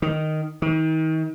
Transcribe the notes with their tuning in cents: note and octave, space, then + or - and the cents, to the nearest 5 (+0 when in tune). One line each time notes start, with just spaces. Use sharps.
D#3 -5
D#3 +35